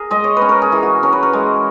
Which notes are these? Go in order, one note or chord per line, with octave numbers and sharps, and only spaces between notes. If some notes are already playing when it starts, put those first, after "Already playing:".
Already playing: G#4 A#4
G#3 D#5
C#5
B4
C#4
A#4
G#4
E3
F#4
C#4 A#4
B4
A#4
G#3